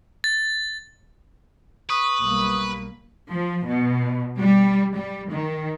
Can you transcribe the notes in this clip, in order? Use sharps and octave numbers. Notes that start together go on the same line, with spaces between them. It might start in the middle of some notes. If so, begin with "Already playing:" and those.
A6
B4 C#6 D#6
B1 G3 A#3
F3
B2
G3
G3
D#3